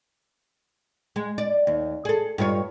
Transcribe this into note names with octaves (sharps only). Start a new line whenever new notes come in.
G#3
D5
D#2
G#4 A4
G2 F4 C#5